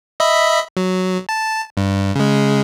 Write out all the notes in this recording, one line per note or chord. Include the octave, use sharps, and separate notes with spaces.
D#5 E5 B5
F#3
A5
G2
C#3 G#3